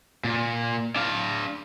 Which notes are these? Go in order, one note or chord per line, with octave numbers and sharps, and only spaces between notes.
A#2
D4 F5